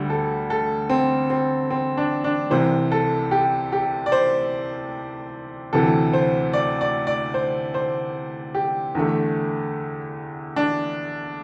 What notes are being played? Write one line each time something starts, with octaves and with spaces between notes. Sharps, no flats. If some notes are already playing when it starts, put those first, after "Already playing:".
Already playing: D2 D3 G3
A4
A4
C4
C4
C4
D4
D4
C2 C3 E3 C5
A4
G4
G4
D5
C5
D2 C3 E3 A4
C5
D5
D5
D5
C5
C5
G4
E2 D3 A3
D4